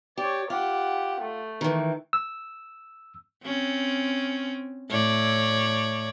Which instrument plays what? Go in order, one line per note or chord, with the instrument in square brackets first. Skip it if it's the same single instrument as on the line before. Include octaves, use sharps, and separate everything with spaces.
[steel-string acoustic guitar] G4 [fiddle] C#5 D5
[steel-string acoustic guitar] F4 [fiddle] G4 F#5
[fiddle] A3
[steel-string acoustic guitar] D#3 E3
[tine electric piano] E6
[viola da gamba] C4 C#4
A2 C#5 D5